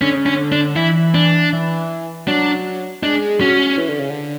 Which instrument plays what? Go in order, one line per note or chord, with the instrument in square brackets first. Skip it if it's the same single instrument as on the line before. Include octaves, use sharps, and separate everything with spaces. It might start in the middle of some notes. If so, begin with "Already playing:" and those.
[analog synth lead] D3 [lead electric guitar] C#4
[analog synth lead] C#3
[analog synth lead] D3 [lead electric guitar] C#4
[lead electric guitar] D4
[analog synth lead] D3
[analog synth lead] E3 [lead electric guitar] E4
[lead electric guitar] D4
[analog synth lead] E3
[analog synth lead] F#3 [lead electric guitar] D4
[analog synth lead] G#3 [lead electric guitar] D4
[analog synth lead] G#3
[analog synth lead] F#3 [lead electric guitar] C#4
[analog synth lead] E3
D3
C#3
D3